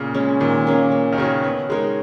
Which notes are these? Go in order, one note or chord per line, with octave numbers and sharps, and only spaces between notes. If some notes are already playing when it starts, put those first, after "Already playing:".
Already playing: A#2 C#3
G#3 C#4
A#2 D#3
A#3 C#4 G#4
A#3
D#3
C#3 C#4 F#4 C#5
B3
G#3 D#4 A#4 C#5